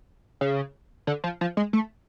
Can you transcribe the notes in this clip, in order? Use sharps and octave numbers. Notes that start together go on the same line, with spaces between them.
C#3
D3
F3
F3
G#3
A3